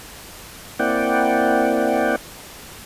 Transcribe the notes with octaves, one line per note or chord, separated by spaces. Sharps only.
A#3 C4 E4 D5 F#5 G5